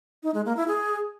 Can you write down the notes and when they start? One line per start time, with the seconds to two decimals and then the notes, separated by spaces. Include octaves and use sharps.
0.23 D#4
0.34 G#3
0.45 A#3
0.57 E4
0.68 G#4